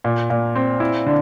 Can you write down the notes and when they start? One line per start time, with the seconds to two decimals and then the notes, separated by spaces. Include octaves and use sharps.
0.04 A#2
0.30 A#2
0.55 C4
0.80 E4
1.06 D3